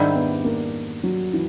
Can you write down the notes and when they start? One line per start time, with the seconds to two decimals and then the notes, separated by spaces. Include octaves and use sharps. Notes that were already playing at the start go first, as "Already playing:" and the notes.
Already playing: G#2 D#3 G3 C4 D4 E4
0.15 B3
0.44 A#3
1.04 F#3
1.33 E3